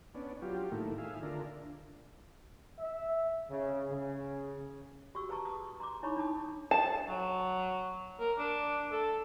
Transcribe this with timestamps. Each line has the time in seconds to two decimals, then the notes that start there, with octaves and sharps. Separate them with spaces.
0.15 B3 C#4 D4
0.42 F#3 F4 G4
0.71 A2 D#3 A3 A#3 E4
0.98 G#4 E5 F5
1.23 D3 D4 F4 A#4
2.79 E5
3.51 C#3
3.89 C#3
5.15 F#4 G4 C#6 E6
5.29 G#4 B4 A5 A#5 C#6
5.45 D#6
5.80 A#5 C6 D6
6.03 D#4 E4 C#5 A#5 B5 C#6
6.16 D4 D#4 A5 D#6
6.71 A5
7.09 F#3
8.20 A#4
8.39 D4
8.91 A4